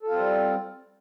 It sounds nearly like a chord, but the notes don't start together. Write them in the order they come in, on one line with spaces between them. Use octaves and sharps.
A4 F4 C4 G3